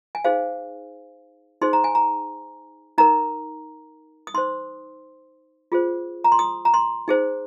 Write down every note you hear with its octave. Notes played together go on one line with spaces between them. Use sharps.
G#5
D#4 G#4 C5 F5
D#4 G#4 C5 C6
A#5
G#5
A#5
D#4 A#4 A#5
D#6
D#4 C5 C6
F4 G#4 C5
A#5
C6
D#6
A#5
C6
D#4 G#4 C5